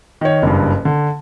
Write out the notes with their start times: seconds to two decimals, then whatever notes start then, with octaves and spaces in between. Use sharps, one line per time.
0.21 D#3 C#5
0.43 F#1 G2
0.85 D3